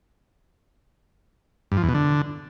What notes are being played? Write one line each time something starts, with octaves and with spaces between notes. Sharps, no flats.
G2
F3
E2
B2
D3